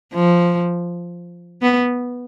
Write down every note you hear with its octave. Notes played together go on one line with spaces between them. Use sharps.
F3
B3